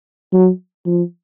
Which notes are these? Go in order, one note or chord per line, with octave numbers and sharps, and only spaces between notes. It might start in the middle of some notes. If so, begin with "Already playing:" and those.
F#3
F3